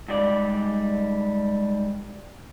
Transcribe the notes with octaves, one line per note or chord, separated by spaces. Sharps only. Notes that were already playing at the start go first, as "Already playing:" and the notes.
G#2 G3 D5